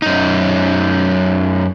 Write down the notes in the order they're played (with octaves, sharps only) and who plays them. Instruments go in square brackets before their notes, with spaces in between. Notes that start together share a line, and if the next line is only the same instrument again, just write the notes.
[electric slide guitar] F#2 D#4